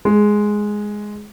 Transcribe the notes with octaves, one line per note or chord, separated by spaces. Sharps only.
G#3